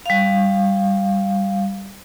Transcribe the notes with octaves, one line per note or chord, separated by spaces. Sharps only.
G3 F5